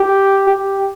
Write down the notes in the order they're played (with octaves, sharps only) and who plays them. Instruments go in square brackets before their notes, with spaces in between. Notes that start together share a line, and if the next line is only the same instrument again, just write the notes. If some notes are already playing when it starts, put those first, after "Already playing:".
Already playing: [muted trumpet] G4
G4